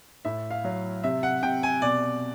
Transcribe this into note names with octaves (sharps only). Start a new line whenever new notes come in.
A2 E5
F5
F#3
C3 E5
F#5
C3 G5
G#5
B2 D5